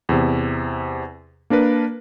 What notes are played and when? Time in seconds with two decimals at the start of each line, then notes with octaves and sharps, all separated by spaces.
0.09 E2 C3
1.50 A#3 D4 A#4 B4